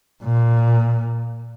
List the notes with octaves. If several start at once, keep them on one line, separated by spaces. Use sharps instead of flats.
A#2